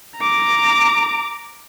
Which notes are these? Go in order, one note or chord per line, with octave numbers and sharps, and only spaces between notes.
A#5 D6